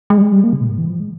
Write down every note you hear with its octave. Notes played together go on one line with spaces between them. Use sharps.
G#3
G3
G#3
G3
A#3
C#3
A#2
G#2
E3
F3
G#3